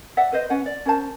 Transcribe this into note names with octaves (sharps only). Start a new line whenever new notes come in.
D5 E5 F#5
B4 C5 D#5
C#4 B4 F#5
D5
C#4 A#4 C5 A5